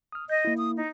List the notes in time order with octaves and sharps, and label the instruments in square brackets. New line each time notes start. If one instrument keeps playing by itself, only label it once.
[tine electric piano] D#6 F6
[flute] D#5 [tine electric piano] G6
[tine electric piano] A#3 E4
[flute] D#6
D#4